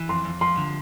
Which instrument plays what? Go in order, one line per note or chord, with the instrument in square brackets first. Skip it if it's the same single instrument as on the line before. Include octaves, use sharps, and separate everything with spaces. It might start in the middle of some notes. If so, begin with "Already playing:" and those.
Already playing: [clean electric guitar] E3
[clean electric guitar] F2 [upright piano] C6
[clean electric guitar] F2
[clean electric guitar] F3 [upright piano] C6
[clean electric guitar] D3